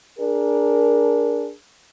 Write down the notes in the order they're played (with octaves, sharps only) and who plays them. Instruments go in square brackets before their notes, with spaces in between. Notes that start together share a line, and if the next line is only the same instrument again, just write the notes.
[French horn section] D4 G#4 A#4